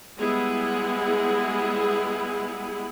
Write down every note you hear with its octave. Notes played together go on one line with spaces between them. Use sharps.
G3 G#3 B3 E4 G#4